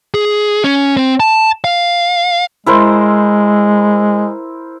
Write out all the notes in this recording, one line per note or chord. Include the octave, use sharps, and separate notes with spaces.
G#4
C#4
C4
A5
F5
G#3 E4 A#4 C5